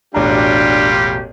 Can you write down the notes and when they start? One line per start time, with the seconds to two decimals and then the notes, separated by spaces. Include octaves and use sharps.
0.14 E1 A1 F#3 G3 D4 F4 G4 A#5